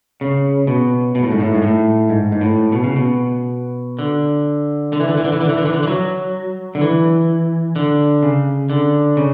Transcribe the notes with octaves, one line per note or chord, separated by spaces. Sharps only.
C#3
B2
B2
A2
G#2
A2
G#2
A2
G#2
G#2
A2
B2
C#3
B2
D3
D3
E3
D3
E3
D3
E3
D3
E3
D3
E3
D3
E3
F#3
D3
E3
D3
C#3
D3
C#3